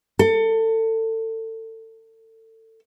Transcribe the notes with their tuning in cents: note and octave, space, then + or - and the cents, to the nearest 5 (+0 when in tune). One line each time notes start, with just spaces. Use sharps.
A4 +30